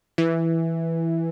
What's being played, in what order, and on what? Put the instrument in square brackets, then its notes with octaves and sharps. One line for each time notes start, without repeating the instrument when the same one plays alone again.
[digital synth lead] E3